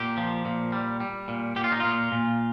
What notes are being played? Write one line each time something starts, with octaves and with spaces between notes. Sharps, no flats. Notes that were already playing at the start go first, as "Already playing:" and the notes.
Already playing: A#2 G4
F3
A#2
G3
G3
A#2
A#2 G4
F4
D#4
A#2 F4
A#2